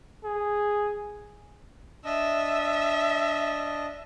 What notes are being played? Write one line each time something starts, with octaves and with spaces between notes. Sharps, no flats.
G#4
D4 D#5 E5